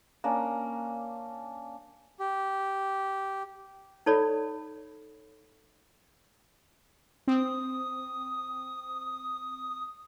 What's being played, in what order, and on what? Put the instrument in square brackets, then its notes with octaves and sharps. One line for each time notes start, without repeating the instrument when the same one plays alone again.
[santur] A#3 C#4 D4
[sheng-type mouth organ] G4
[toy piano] D#4 A4 C#5 D5 B5
[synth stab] C4 [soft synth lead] D#6